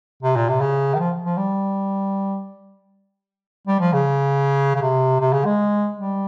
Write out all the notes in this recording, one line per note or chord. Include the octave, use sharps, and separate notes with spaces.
C3
A#2
C3
C#3
D#3
F3
F3
G3
G3
F3
C#3
C#3
C3
C3
C#3
G#3
G3